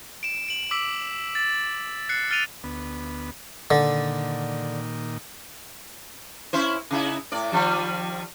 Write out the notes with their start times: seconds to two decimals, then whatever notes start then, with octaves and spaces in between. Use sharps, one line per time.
0.23 D7 E7
0.48 D7 F#7
0.71 D6 E6 B6 D7 F#7
1.35 A6
2.09 F#6 A6 C7 C#7
2.31 F6 A6 D7 D#7 F7
2.64 D2 B3
3.71 A#2 D3 D#3
6.53 C#4 E4 C5
6.91 C#3 D#4 E4
7.32 A2 D5
7.52 D#3 F3 G3